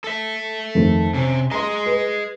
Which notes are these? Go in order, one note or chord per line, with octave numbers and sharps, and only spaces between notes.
A4 E5
F2 D#3 A3
C3 C#4
G#4 D#5 A#5 C6
B4